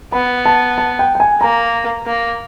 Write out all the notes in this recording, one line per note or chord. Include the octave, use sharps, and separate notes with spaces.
B3 B5
A5
A5
G5
G5
G#5
A#3 A#5
A#3